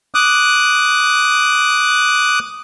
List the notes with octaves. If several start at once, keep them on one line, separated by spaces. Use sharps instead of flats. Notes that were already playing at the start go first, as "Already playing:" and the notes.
D6 D#6 F#6